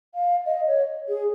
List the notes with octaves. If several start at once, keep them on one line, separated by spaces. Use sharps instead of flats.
F5
D#5
C#5
G#4